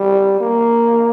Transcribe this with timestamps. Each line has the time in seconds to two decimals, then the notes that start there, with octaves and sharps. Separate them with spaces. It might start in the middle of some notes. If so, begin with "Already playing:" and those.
Already playing: G3
0.41 A#3